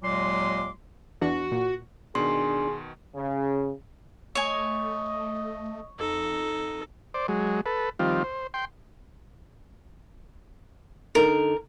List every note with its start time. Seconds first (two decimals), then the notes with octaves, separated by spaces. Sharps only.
0.03 D#2 A#2 F#3 G#3 C6 D6
1.21 E2 E3 D4 F#4
1.52 A#2
2.15 B2 D#3 D4 G#4 C6
3.15 C#3
4.35 A3 C#5 D#5 G#5
5.99 F2 D#4 A4
7.14 C5 D5
7.28 F#3 G#3
7.66 A4 B4
7.99 D#3 F3 G3 C4 F4
8.24 C5
8.54 G5 C6
11.15 D3 D#4 A4 A#4